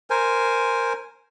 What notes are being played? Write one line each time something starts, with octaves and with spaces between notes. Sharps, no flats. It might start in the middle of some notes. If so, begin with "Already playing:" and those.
A#4 C5 G#5